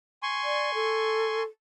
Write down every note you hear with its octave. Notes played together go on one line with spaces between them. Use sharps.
G#5 C6 C#6
D5
A4